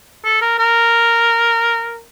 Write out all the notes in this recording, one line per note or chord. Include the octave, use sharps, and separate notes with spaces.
A4
A#4
A#4